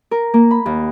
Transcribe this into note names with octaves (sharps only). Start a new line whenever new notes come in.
A#4
A#3
B5
D#2